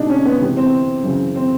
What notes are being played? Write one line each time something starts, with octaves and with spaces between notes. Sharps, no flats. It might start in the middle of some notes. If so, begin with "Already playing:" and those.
Already playing: B2 G#3 D4 D#4
C#4
B3
C3 E3 G#3
C4
F#2 C#3 E3
C4